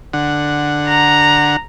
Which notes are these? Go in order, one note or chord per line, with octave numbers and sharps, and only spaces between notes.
D3 F#5
A#5